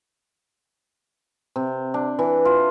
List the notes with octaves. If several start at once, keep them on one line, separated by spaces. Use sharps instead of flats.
C3
D4
E3
F4